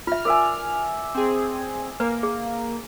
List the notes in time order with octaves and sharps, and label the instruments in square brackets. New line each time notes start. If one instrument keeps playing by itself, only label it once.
[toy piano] F4 E5 [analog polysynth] F6
[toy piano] A#4 [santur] D5 E5 G#5
[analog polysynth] C4 G#4
[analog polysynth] A#3 [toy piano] B4
[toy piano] G#4